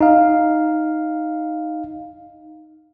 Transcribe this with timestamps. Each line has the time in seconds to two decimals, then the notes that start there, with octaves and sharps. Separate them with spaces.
0.01 D#4 F5